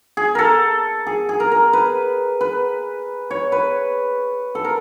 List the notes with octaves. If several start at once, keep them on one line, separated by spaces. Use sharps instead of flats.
G#4
A4 A#4
G#4
G#4
A#4
A#4
B4
B4
C#5
B4
A4
A#4